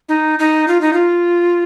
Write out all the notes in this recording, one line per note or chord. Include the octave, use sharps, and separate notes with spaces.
D#4
D#4
F4
D#4
F4